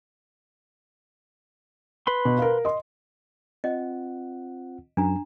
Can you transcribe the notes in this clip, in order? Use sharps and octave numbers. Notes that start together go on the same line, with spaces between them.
B4 B5 C6
B2
A#4 F5
D#5 C6
C4 F4 D#5 F#5
F#2 D4 A#5